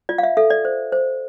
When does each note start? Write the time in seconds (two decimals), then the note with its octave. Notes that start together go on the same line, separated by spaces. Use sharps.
0.09 F4 D5
0.18 F5
0.23 E5
0.37 A4 E5
0.50 D5
0.65 C5
0.92 C5